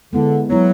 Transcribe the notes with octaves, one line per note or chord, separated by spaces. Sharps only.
D3 G#3 B3 E4
F#3 G#3 B3 E4